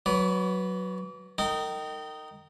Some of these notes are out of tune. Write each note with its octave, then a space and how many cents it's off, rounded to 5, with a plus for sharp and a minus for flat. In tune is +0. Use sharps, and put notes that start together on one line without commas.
F#3 +5 B4 +0 D5 -40
D#4 +0 A#4 -40 G5 -25